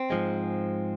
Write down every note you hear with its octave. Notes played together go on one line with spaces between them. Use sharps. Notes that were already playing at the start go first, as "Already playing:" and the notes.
Already playing: C4
G#2 F3 G#3